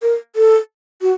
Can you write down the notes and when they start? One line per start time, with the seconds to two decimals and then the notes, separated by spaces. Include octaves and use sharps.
0.02 A#4
0.36 A4
1.02 F#4